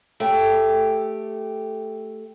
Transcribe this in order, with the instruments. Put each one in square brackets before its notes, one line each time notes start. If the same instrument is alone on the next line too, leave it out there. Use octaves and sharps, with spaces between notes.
[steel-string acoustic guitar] A3 G4